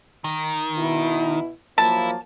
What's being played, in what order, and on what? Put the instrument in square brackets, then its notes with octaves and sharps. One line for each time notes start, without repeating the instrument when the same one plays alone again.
[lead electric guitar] D#3
[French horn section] B2 E4
[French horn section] F3 F#3 A#3 [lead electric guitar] E4 [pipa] A5